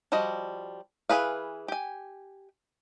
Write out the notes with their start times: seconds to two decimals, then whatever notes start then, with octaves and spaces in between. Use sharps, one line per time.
0.12 F3 G3 F#4 D#5
1.09 E3 F3 G#4 B4 F5
1.68 G4 G#5